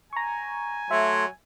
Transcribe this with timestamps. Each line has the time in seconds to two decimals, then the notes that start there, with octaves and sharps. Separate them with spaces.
0.13 G#5 A#5 C#6
0.91 F#3 A3 E5 C6